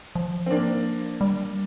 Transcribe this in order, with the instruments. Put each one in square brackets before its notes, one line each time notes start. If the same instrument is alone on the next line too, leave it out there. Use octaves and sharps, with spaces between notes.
[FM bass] F3
[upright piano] C4
A#3 D4
[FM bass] G3